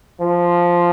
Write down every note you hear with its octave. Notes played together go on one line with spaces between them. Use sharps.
F3